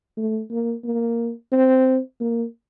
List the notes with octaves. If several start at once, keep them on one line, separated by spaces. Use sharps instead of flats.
A3
A#3
A#3
C4
A#3